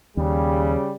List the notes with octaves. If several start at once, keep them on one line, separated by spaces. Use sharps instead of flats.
D#2 C#3 G3